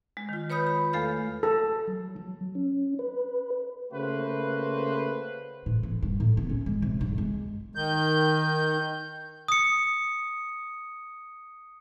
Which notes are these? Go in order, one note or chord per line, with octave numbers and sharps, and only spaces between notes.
G#3
D#3 F4
B4 C#5 B5 D#6 G6
B5
E2 A3 A4 F5 F6
A4
F#3
F#3
C#4
B4
C#3 A3 A#3 F#4 B4 C5
A2
A1
G2
A2
B3
C#4
G#3
C3
G2
G#3
D#3 G6
D#6 C#7